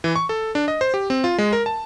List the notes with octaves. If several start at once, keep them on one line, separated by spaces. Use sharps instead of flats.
E3
C#6
A4
D4
D#5
C5
G4
C4
F4
G#3
A#4
A5